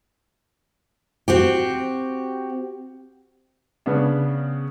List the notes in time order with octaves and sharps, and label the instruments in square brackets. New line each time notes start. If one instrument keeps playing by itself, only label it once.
[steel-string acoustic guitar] C4 F#4 G4
[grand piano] C#3 B3 D4